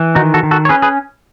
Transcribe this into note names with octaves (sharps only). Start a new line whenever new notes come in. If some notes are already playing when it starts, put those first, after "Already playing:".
Already playing: E3
D#3 D#4 F#4
F#4 A4
D#3
F#4 A4
C#5
C#4 G#4 B4
G#4 B4